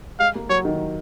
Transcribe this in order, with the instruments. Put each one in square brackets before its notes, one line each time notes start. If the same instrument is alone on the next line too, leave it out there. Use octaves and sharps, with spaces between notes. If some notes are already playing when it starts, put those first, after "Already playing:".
[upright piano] G#3 [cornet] F5
[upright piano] A#3
[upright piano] F#3 [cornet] C#5
[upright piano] D#3